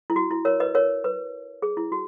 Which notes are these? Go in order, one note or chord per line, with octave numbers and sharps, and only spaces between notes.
E4
F#4
E4
A#4 C#5
B4 D#5
A#4 C#5
B4
G#4
E4
F#4